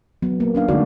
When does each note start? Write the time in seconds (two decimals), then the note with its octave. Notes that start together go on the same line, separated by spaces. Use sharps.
0.22 F#3 B3
0.40 A#3
0.55 C#4 D4 F5
0.68 D3 G#3 A3 D#4 F#4 D5